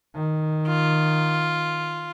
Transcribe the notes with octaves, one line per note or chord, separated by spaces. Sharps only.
D#3
F4